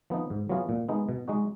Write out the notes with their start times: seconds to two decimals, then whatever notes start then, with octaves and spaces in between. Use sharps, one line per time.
0.10 F3 B3 D#4
0.30 G#2
0.49 F#3 B3 F4 G#4
0.69 A#2
0.89 G#3 B3 D#4
1.09 B2
1.28 G#3 D#4 F#4